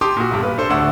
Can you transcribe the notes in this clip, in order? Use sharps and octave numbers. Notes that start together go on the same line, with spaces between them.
G4 A5 C6 D6 D#6
A#2 F#4
B1 G2
B4
D4 A4 C5
D1 D2 A3 D4 F#5 E6